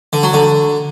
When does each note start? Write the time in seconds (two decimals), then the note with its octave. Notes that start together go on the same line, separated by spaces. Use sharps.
0.13 D3
0.23 F#3
0.34 D3